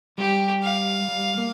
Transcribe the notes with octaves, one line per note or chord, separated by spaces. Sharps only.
G3 G4
F5
G3
A#3